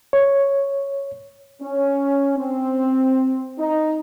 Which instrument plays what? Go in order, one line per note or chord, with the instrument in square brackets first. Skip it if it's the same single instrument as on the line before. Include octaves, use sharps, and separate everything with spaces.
[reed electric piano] C#5
[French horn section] C#4
C4
D#4